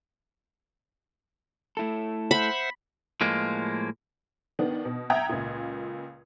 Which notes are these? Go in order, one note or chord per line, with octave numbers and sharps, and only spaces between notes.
A3 E4 A4
C5 E5 F#5 B5
A2 F3 G#3 A#3
D#3 B3 D4
B2
E5 F#5 G5 A#5 D#6 G#6
C#2 A#2